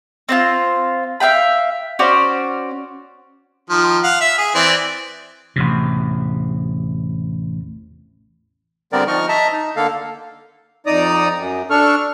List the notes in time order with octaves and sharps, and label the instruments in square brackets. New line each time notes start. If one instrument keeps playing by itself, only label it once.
[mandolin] C4 D4 F4
E5 F5 G5 B5
C#4 F#4 C5 D5
[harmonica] D#3 F3
F5 F#5
E5
G#4
E3 C4 D5
[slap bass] A1 E2 C3
[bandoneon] D3 G3 B3 C4 A#4 D5
F3 D#4 D#5 C#6 F6
D#5 E5 A5 A#5
D#4
D3 A#3 A4 F5
[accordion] F2 D#4 D5 A#5 D#6
F#2
D4 A4 C#6 F6